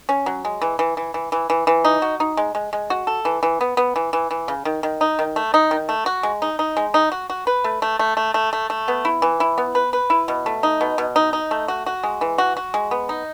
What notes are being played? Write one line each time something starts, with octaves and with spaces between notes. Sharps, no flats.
C#4
F#3
G#3
E3
E3
E3
E3
E3
E3
E3
D#4
F#4
D#4
G#3
G#3
G#3
F#4
A4
E3
E3
B3
B3
E3
E3
E3
C#3
D#3
D#3
D#4
D#3
A3
D#4
D#3
A3
F#4
G#3
D#4
D#4
G#3
D#4
F#4
F#4
B4
A3
A3
A3
A3
A3
A3
A3
B3
E4
E3
E4
B3
B4
B4
E4
B2
A3
D#4
B2
B2
D#4
D#4
A3
F#4
F#4
G#3
E3
F#4
F#4
G#3
B3
D#4